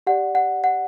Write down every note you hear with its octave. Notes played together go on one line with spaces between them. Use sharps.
G4 D5 F#5
F#5
F#5